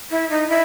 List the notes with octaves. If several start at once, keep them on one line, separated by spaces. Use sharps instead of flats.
E4
D#4
E4